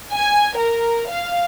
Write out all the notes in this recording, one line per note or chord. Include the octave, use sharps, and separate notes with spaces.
G#5
A#4
F5